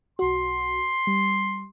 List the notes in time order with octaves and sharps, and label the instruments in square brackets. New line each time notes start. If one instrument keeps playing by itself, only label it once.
[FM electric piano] B1 F#4 [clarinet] C6
[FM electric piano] G3